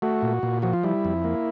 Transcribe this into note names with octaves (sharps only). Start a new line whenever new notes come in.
A3 F#4
A#2
A#2
F3 F#4
F4
G3 E4
F2
A#3